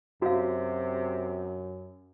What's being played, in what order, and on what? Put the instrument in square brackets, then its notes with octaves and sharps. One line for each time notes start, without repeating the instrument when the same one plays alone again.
[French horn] F#2 [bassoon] C3 [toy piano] F#4 F5